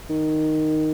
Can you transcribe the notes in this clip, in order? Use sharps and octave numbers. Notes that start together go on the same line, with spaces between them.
D#3